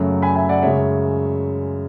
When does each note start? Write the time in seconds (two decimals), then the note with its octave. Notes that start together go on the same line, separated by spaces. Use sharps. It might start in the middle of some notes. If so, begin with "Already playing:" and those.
Already playing: F#2 C#3 F#3 A3
0.22 G#5 B5
0.35 E5 G#5
0.49 D5 F#5
0.62 F#2 C#3 G#3 C#5 E5